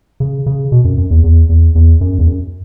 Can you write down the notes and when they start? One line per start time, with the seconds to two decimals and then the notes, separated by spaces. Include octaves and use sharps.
0.20 C#3
0.46 C#3
0.72 B2
0.84 F#2
0.98 F#2
1.11 E2
1.24 E2
1.49 E2
1.75 E2
2.01 F#2
2.19 E2
2.27 F#2